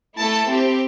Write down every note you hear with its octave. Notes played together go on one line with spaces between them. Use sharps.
A3 E4 A4 A5
C4 G4